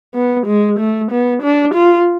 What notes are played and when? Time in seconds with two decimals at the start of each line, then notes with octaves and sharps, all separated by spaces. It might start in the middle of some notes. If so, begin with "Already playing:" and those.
0.15 B3
0.47 G#3
0.79 A3
1.11 B3
1.43 D4
1.74 F4